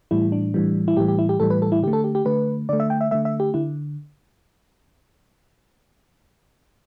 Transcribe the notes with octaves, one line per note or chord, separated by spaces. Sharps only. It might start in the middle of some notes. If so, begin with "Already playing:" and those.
A2 E3 G3 E4
D4
A2 E3 G3
E4
A2 E3 G3 G4
G4
E4
G4
A2 E3 G3 A4
B4
A4
E4
D3 A3 G4
A4
G4
G4
D3 A3 B4
D3 A3 D5
E5
G5
E5
D3 A3 E5
E5
G4
D3 E4